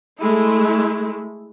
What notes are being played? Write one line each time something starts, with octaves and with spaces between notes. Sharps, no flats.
G#3 A3 E4